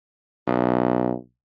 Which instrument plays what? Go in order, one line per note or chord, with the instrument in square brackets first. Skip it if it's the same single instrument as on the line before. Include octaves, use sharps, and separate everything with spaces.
[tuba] B1